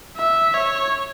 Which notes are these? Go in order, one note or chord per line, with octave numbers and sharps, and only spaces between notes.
E5
C#5